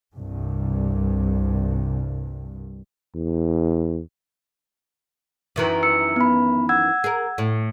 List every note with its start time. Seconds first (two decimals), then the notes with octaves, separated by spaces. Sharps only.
0.15 C2 G2
3.15 E2
5.56 F#2 D#3 E3
5.83 E6 C#7
6.16 B3 B5
6.69 F#5 E6 G#6
7.04 G#4 A#4
7.38 A2